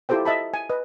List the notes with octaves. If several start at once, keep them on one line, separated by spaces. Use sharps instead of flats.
E4 F4 G4 A4 C5 G5
D#5 E5 A5 B5
G#5
B4 D#5